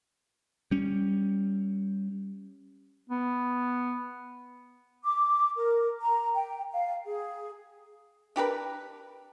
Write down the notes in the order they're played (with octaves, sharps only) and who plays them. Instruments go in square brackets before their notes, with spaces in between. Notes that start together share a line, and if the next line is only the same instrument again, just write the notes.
[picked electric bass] G3 C#4
[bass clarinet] B3
[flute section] D6
A#4
A#5
G5
F5
G#4
[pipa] D4 G4 A#4 B4